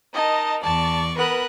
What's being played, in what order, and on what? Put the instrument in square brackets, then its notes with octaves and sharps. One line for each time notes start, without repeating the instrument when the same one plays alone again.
[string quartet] D#4 A#4 [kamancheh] D#5 A5
[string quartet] E2 D5 C#6 [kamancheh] A5
[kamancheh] B3 F#6 [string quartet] A#4 B4 D#6